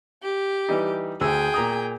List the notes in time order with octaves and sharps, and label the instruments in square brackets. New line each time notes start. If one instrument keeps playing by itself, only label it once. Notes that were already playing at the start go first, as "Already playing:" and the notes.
[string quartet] G4
[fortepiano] E3 G3 D#4
[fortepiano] D2 E6 [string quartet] G#4 G5
[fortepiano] A#2 A#5 D#6